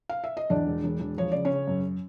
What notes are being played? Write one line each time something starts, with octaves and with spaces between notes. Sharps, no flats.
F5
E5
D#5
E2 D4 D5
E1
E1
E1
F3 C#5
C#3 D5
C#4 C#5
C#3
F#2